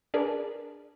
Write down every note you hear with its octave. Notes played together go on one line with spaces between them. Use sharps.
D4 G#4 A#4 B4 D5